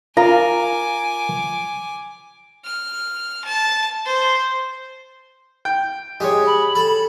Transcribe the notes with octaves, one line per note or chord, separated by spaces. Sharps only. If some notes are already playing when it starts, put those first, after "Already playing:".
F4 A#4 G#5 A#5 D6
F6
A5
C5
G5
G#3 G4 C#5
B5
A4